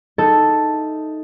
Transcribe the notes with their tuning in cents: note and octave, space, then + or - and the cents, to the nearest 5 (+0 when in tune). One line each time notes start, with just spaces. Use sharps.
D#4 +0 A4 +0 E5 +0